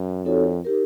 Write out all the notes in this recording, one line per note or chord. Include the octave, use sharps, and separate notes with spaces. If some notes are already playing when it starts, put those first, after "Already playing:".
Already playing: F#2
F2 C4 D#4 F#4 A4 C#5
D#4 G4 A#4